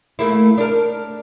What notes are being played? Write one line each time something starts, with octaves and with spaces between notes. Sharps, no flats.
A3 A#3 E4
D4 A#4